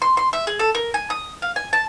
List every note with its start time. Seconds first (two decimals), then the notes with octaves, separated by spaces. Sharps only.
0.02 C6
0.17 C6
0.33 E5
0.47 G#4
0.59 A4
0.75 A#4
0.94 G#5
1.10 D#6
1.42 F5
1.56 G#5
1.73 A5